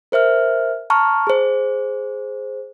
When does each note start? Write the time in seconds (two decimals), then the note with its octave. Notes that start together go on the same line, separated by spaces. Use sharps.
0.12 A#4 C5 E5 F6
0.90 A5 A#5 C#6 F6
1.27 G#4 C5